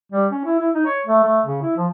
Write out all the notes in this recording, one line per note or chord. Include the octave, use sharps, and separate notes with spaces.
G3
C#4
E4
E4
D#4
C#5
A3
A3
C#3
E4
F3